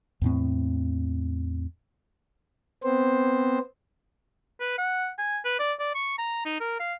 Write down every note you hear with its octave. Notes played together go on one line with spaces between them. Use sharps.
E2 A2 C4
B3 C4 C5
B4
F#5
G#5
B4
D5
D5
C#6
A#5
D#4
A#4
F5